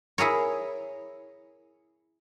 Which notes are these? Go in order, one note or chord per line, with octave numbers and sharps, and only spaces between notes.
E4 G#4 A#4 C#5